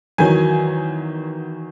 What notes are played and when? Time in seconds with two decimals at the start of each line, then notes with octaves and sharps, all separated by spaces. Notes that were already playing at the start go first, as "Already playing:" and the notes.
0.18 E2 D#3 F#3 G#5